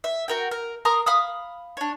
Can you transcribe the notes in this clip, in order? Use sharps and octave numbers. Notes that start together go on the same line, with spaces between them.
E5
F#4 A#4 G5
A#4
A#4 A#5 C6 D#6
F5 B5 D#6
D4 C#5